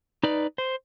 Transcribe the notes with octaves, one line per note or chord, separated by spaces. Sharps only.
D#4 B4 D5
C5